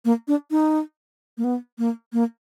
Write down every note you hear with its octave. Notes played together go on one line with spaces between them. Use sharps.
A#3
D4
D#4
A#3
B3
A#3
A#3